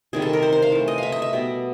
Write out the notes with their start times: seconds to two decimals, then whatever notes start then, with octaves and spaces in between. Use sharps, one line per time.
0.13 C3 D#3 G3 G#4
0.22 A4
0.33 A#4
0.42 C5
0.52 C5
0.62 F5
0.72 E3 A3
0.88 D#5
0.98 E5 F5
1.12 D#5
1.22 E5
1.33 B2 G3 B3